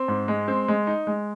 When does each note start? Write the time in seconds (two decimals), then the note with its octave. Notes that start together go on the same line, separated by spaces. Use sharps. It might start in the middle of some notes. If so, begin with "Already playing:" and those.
Already playing: C4
0.08 G#2
0.28 G#3
0.48 C4
0.68 G#3
0.87 D#4
1.07 G#3